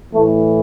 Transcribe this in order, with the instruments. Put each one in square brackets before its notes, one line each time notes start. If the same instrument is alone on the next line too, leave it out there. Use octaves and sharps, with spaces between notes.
[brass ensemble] A2 E3 A3